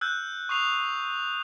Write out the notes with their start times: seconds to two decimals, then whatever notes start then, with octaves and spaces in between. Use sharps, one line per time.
0.01 E6 F#6 G6
0.49 C#6 D#6 C7 F7